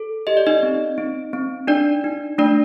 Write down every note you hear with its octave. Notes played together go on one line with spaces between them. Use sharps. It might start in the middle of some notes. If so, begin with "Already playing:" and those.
Already playing: A4
G4 D#5
D5
D#4 D#5
C4
C4
C4
D4 D#4 D5
D#4
A3 D4 D5